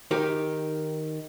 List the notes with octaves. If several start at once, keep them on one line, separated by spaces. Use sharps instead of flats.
D#3 D#4 G4